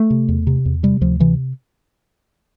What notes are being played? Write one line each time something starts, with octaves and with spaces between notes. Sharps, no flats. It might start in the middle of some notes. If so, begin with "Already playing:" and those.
Already playing: A3
C3
E2
C3
E2
C3 G3
D2 F3
C3 E3